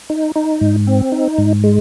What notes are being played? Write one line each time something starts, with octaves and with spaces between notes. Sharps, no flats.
D#4
D#4
G#2
C4
D#4
G#2
G#3